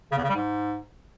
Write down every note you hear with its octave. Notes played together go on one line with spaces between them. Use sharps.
C#3
E2
C#3
G3
G#2